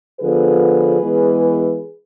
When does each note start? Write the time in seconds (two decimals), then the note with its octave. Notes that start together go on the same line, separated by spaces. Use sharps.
0.21 D3 F3 B3 G#4 B4
1.02 E3 G#3 B3